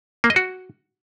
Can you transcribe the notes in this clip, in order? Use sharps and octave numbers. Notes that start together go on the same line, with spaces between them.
A#3
D#5
F#4